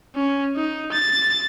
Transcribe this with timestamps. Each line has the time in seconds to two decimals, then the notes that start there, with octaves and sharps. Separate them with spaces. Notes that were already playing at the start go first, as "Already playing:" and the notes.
0.16 C#4
0.56 D#4
0.92 A6